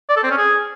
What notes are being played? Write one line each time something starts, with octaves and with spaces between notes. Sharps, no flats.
D5
A4
C4
C#4
G#4